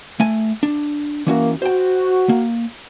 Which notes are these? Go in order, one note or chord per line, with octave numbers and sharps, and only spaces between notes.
A3 G#5
D4
E3 A#3 C#4 F#4
F#4 C5 G5
A#3